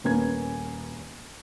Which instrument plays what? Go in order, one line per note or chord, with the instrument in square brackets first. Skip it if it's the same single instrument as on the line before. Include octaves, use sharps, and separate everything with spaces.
[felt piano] D#1 A#3 B3 C#4 G#5 G#6